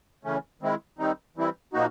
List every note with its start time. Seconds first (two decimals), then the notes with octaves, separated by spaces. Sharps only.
0.24 C#3 E3 A3 C#4
0.62 D#3 G#3 C4 E4
0.99 D#3 G3 C4 D#4
1.37 E3 G3 C4 E4
1.73 A#2 F3 A#3 D#4 F#4